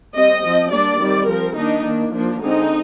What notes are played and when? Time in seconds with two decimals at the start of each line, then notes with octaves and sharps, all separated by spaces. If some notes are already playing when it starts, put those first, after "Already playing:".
0.15 G3 C4 D#5
0.42 F3 C4
0.71 G3 A#3 D4 D5
0.99 D#3 G3 C4
1.28 F3 C4 A#4
1.56 D#3 A#3 D4 D#4
1.84 D#3 A#3 D4
2.13 F3 A#3 D4
2.41 D3 G#3 C4 D#4